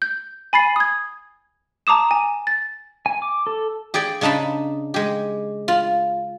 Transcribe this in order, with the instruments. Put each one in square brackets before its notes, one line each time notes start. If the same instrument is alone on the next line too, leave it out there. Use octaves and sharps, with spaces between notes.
[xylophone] G6
G#5 B5 A6 C7
D#6 G#6
A5 A#5 D6 D#6 E7
G#5 E7
A6
[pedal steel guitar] G#5
D6
A4
[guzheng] G4 G#4 D5 G5
C#3 D4 D#4 A5 B5
G#3 G4
F4